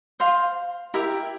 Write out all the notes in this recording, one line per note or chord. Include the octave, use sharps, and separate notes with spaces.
C5 F5 C6
E4 G4 A#4 E5